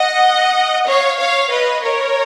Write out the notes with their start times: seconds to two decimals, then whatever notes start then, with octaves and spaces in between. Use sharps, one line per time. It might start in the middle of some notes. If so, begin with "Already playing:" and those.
Already playing: D#5 F#5
0.87 C#5 F5
1.18 C#5 F5
1.51 B4 D#5
1.82 A#4 C#5